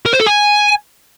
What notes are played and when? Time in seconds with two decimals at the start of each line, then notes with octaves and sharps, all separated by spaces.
0.06 A#4
0.13 C5
0.20 A4
0.27 G#5